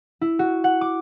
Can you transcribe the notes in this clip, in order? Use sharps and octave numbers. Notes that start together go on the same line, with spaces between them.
E4
F#4
F#5
D6